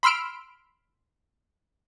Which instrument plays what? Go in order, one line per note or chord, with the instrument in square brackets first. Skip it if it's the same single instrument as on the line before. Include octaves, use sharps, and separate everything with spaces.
[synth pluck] B5 C6 E6 F6 D7